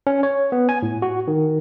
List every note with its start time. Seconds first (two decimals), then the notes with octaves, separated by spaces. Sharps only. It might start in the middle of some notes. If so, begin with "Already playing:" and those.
0.07 C#4
0.23 C#5
0.52 B3
0.69 G#5
0.83 A2
1.02 F#4
1.28 D#3